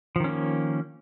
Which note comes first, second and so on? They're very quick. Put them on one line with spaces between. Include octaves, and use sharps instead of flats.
F3 D#3 C#4 A#3